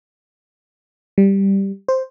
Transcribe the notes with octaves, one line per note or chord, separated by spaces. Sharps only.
G3
C5